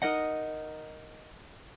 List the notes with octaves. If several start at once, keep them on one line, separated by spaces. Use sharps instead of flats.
D#4 A#4 D#5 F#5